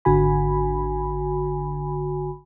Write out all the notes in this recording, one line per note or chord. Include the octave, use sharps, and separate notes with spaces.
G#1 D3 F#4 G#5 B5